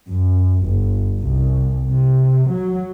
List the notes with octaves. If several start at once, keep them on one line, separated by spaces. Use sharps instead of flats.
F#2
G1
C2
C3
F#3